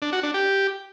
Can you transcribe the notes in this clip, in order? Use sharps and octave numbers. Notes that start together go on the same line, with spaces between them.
D4
F#4
D4
G4